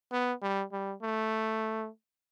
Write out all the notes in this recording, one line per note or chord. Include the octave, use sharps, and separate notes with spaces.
B3
G3
G3
A3